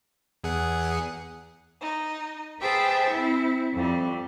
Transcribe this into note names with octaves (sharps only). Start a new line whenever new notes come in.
E2 G#4 F#5
D#4
G#4 B4 C5 E5 G5 A5
C4 E4
F2 G3